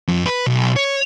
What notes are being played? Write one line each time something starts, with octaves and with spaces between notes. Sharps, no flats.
F2
B4
B1
C#5